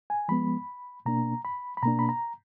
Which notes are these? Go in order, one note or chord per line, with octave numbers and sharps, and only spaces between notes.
G#5
F3 G#3 B3 B5
B2 A#3 D4 A#5
B5
B5
B2 A#3 D4 A#5
B5
A#5